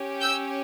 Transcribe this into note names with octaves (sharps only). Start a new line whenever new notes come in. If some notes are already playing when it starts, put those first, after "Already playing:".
Already playing: C#4 G4
E6 G6